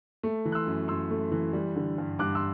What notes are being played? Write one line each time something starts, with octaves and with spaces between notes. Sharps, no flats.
A3
E3
F#6
C6 E6
F#2
F#2 C6 E6
A3
E3
G3
D3
G2
G2 D6 F#6
C6 E6